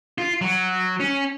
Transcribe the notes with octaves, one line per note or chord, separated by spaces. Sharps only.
F4
F#3
C#4